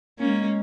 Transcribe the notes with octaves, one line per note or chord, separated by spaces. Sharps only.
G#3 A#3 C#4